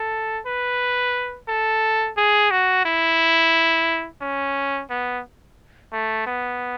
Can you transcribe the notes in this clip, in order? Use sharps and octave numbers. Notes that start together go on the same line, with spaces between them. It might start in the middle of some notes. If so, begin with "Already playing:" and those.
Already playing: A4
B4
A4
G#4
F#4
E4
C#4
B3
A3
B3